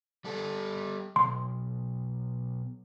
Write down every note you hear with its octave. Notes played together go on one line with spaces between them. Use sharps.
G3 A4
B1 C6